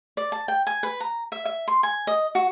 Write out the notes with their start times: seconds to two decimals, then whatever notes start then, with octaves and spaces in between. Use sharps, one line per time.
0.17 D5
0.32 A5
0.48 G5
0.67 G#5
0.83 B4
1.00 A#5
1.32 E5
1.45 E5
1.68 C6
1.83 G#5
2.07 D#5
2.35 F#4